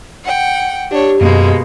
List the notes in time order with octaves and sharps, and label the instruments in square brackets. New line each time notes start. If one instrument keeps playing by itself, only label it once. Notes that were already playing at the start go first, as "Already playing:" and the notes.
[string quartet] F#5 G5
[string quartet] D4 C#5 [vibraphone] G4
[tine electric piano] F#2 [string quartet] B2 G#3 A#3